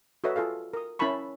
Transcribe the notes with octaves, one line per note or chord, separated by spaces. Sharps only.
F#4 A4 B4 C#5 D#5 E5
F4 G#4 A4 F5
A#4 D#6
C#4 E4 A#4 A5 B5 C#6